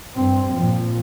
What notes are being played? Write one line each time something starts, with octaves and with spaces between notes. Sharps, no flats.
G2 C4
A#2 F3